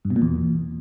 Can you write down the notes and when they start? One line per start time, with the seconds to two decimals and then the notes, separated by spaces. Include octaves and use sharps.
0.05 G2
0.10 B2
0.16 A#2
0.22 E2